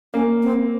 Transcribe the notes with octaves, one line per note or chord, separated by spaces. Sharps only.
A#3 C#4
C4